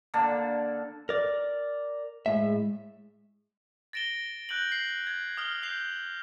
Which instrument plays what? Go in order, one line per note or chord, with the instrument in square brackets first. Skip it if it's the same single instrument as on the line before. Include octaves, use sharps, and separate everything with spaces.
[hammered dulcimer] D3 A#3 D4 A4
[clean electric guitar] A#4 D5
[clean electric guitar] A2 E5 [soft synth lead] G#3
[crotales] A6 A#6 D7 E7 G7
F#6 G6 D7 F#7
C7
G#6
D#6 F6 G7
G6 C7 F7 F#7